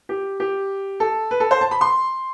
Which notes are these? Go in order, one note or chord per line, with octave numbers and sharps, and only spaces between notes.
G4
G4
A4
B4
A4
C5
A5
B5
C6